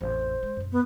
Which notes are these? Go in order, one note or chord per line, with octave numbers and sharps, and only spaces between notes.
A1 F2 C5
G#3
F#2 B2
B3